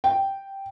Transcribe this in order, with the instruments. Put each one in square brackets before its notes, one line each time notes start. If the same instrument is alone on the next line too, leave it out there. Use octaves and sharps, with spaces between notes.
[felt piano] G5